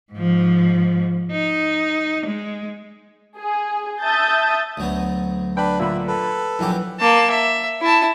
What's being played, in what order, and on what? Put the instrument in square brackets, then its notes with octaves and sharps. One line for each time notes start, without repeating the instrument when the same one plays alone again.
[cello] G#2 F3
D#4
G#3
[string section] G#4
E5 A5 D#6 G6 A6
[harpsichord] D2 F#3 B3
[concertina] D4 B4 [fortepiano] G5 B5
[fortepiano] A#2 D3 B5 [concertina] E5
[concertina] A4 B4
[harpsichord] A#1 F#3 G4 [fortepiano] E3
[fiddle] A#3 A5
E5
E4 A5